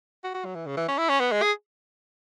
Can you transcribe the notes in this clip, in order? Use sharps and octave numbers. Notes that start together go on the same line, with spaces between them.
F#4
F#4
F#3
E3
C#3
E3
C#4
E4
C#4
B3
G#3
G#4